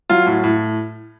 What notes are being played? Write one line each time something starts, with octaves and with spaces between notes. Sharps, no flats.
F#3 F4
A2
A2